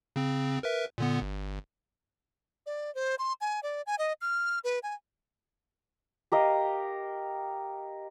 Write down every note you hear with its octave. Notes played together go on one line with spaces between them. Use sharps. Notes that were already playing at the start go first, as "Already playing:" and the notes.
C#3 C4
A#4 B4 E5
A#2 D3 B3
G1
D5
C5
C6
G#5
D5
G#5
D#5
F6
B4
G#5
G4 A#4 D#5 F5